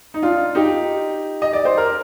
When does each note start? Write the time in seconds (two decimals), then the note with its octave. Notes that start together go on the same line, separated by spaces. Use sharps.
0.14 D#4
0.23 D4 F4
0.55 D#4 G4
1.42 D#5
1.53 D5
1.65 C5
1.77 A#4